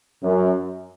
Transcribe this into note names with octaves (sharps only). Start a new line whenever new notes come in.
F#2